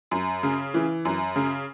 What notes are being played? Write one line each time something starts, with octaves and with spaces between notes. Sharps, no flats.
F#2
C#3
E3
F#2
C#3